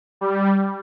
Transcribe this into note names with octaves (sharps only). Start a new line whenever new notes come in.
G3